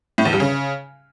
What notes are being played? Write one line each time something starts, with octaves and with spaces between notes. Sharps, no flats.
A2
E2
G2
C#3